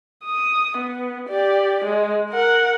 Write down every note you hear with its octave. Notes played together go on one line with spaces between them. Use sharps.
D#6
B3
G4 D5
G#3
A#4 F#5